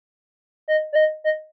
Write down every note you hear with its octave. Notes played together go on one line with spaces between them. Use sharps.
D#5
D5
D#5
D#5